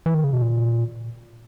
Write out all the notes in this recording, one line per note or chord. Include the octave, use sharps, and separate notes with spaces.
E3
D#3
C#3
B2
A#2